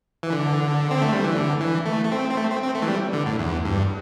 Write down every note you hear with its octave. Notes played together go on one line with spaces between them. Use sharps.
E3
D3
C4
A3
G3
E3
D3
E3
A3
A3
C4
C4
A3
C4
C4
A3
E3
G3
D3
A2
E2
G2